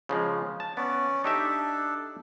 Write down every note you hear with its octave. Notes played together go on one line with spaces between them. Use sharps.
C#3 F3 G#3
A5
B3 C#4 D5
D4 D#4 G4 A4 E5